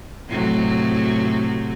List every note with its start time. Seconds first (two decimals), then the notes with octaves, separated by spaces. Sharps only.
0.28 A2 C3 F#3